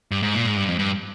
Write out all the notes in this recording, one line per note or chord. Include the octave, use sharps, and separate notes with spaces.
G2
G#2
A#2
G#2
G2
F2
G2